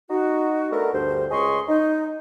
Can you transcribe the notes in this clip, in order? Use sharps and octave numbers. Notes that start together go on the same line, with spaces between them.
D#4 F#4
A3 B3 D4 A4 A#4
D2 G2 C5
C#2 G#4 C#5 D#5 C6 C#6
D#4